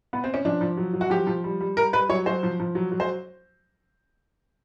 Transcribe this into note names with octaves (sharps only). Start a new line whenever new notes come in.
B3
C4
C#4
F3 D4
F3
F#3
F#3
F#4
F3 G4
F3
G3
G3
G3 A#4
G3 B4
F#3 C#5
F#3 C5
F3
F3
F#3
F#3
C5